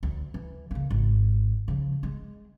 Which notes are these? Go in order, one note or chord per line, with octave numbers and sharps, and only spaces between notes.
D2
E3
C#3 A#3
G#1
C#3 F3
G#3